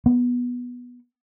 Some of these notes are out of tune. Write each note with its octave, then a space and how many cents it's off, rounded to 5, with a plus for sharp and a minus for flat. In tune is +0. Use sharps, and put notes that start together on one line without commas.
B3 -10